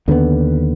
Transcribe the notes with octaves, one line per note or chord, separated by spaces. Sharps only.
D#2 D3 F#3 B3